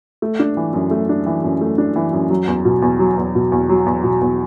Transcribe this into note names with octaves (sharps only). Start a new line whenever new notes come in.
A3
D4
E3
F#2
A3
D4
E3
F#2
A3
D4
E3
F#2
F#3
E2
B2
E2
F#3
E2
B2
E2
F#3
E2
B2
E2